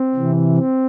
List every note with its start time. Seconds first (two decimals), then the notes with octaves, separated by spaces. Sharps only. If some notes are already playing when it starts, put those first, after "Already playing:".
Already playing: C4
0.15 C3 E3
0.58 C4